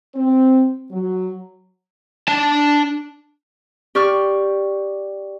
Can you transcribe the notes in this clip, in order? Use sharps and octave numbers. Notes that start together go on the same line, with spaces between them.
C4
F#3
D4 A5
G4 D5 C#6 F6